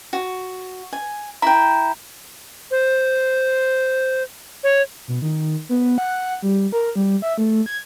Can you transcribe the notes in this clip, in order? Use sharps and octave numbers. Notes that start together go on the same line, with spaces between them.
F#4
G#5
E4 G5 A#5
C5
C#5
B2
D#3
B3
F#5
G3
A#4
G3
E5
A3
G#6